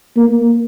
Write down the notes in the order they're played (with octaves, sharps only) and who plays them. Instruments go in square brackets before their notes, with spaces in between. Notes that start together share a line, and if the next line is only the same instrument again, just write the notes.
[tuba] A#3